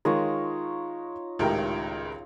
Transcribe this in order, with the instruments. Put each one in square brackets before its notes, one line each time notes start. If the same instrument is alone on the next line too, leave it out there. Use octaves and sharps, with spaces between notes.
[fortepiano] D#3 G#3 [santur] D#4 F4 C#5
[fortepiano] G#1 A2 G5 [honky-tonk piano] C#2 G4 A#4